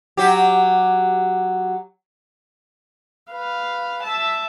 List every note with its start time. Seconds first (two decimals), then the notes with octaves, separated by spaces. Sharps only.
0.17 F#3 G4
3.30 B4 F5
4.04 E5 A5